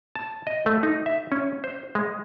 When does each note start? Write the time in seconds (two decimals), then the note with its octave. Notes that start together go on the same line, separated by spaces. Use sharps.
0.15 A5
0.47 D#5
0.66 A3
0.83 D#4
1.06 E5
1.32 C#4
1.64 C5
1.95 G#3